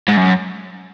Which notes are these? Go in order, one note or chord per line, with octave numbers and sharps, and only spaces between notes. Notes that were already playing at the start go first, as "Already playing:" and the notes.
G#2
F#2